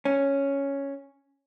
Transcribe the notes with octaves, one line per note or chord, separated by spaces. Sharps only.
C#4